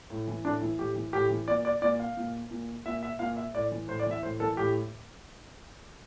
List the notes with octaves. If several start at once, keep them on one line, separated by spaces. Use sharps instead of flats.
A2
E3
A2 D4
E3 E4
A2 G4
E3
A2 G4
E3
A#2 D5
D5
A#2 D5
F5
A#2
A#2
A#2 E5
E5
A#2 F5
E5
A2 D5
E3
A2 C5
D5
E3
E5
A2 C5
E3 A4
A2 G4